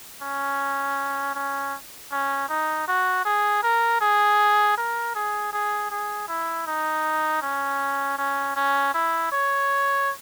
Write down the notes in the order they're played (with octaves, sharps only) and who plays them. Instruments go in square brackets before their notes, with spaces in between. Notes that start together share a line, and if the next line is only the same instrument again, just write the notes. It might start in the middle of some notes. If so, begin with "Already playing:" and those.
[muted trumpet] C#4
C#4
C#4
D#4
F#4
G#4
A#4
G#4
A#4
G#4
G#4
G#4
E4
D#4
C#4
C#4
C#4
E4
C#5